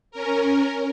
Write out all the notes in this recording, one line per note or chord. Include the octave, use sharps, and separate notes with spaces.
C#4 A#4